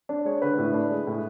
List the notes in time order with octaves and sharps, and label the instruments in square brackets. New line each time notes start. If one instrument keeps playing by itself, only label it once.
[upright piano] D4
G#3 C#5
D3 B4
A2
D4
G#3
A2